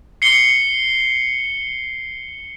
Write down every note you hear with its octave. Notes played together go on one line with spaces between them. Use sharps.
C7 C#7 G7